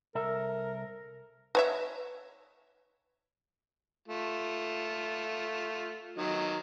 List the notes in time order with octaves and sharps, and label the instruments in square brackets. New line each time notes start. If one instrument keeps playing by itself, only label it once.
[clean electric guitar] C2 A4 E5 [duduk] A#4
[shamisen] B4 C#5 E5
[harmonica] A3 F4
D#3 F#3 D#5